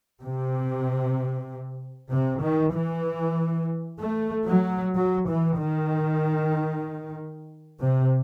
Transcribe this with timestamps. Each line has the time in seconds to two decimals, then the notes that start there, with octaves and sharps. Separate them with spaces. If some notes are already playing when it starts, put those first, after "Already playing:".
0.21 C3
2.11 C3
2.42 D#3
2.74 E3
4.00 A3
4.48 F#3
4.96 F#3
5.28 E3
5.58 D#3
7.80 C3